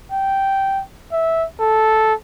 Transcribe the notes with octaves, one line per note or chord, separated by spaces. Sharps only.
G5
E5
A4